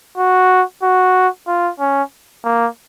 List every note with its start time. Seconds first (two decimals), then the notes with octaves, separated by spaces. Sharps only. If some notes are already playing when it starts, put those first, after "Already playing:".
0.18 F#4
0.83 F#4
1.48 F4
1.80 C#4
2.45 A#3